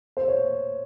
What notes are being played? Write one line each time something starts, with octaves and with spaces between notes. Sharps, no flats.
C5
C#5